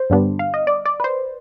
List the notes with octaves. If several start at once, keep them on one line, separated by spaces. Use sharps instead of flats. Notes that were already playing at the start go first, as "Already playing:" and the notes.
Already playing: C5
G2 D3 G3 B3 D4
F5
D#5
D5
D5
B4
C5